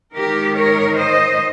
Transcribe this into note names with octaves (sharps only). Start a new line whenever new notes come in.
G#2 D#3 G4 A#4
A#4 C#5
C5 D#5